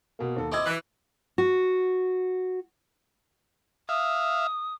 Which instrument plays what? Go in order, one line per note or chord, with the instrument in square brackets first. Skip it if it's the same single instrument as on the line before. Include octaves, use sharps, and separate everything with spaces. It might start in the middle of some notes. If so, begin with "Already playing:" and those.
[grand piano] B2 A#3
D#2 A4
[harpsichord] C4 E4 D#5 [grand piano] D6 E6 G#6
[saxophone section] E3 [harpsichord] B4
[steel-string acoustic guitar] F#4
[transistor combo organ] E5 F5 [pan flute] D#6